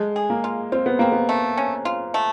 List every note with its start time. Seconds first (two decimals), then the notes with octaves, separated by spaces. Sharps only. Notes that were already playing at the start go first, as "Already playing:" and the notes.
Already playing: G#3 A3
0.16 G#4
0.30 A#3
0.44 F4
0.72 C4 F4
0.86 B3
0.99 A#3 C4
1.12 B3
1.29 A3
1.58 C#4
1.85 F4
2.14 A3